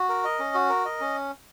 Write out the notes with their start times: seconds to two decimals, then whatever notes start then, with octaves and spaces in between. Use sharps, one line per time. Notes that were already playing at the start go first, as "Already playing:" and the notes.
Already playing: F#4
0.09 A#4
0.24 D#5
0.39 C#4
0.55 F#4
0.70 A#4
0.85 D#5
1.00 C#4